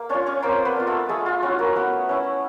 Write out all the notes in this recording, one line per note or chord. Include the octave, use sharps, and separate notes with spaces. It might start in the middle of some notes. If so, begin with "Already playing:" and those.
Already playing: A#3
C#4 D4 F4 C#5
C#4 C#5
A#3 C4 C5
B3 B4
D4 F4
A3 A4
G#3 A3 G#4
F4
C#4 E4 F#4
A#3 A#4
A3 B3 B4
C#4 E4